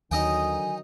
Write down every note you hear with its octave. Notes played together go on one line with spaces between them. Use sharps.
D#2 D3 D#3 F#3 D#4 D#5 G5 G#5